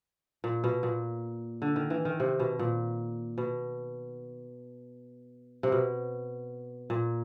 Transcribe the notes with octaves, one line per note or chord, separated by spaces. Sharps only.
A#2
B2
A#2
D3
D#3
E3
D#3
C3
B2
A#2
B2
C3
B2
A#2